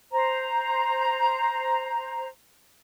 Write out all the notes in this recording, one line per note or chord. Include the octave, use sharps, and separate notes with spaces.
C5 A#5